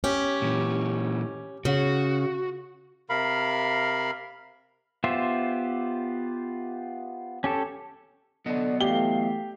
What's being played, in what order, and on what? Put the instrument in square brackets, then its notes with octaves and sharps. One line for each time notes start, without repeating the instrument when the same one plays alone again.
[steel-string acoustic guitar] C#4 G4
[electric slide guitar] A#2 E3
[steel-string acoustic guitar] C#3 [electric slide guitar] F#4
[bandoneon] C3 A#4 F5 B5
[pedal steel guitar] B3 F4 G4 C5 E5
C#4 G4 A4
[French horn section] D3 D4 [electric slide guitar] F#3 B3 D#5 [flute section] D5
[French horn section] E3 A3 [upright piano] G4 G7 [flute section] F5